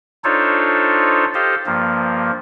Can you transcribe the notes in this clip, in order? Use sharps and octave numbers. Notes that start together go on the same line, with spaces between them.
D4 D#4 F4 A4 C5 C#5
G4 A4 C5 D#5 F5
G2 F3 A#3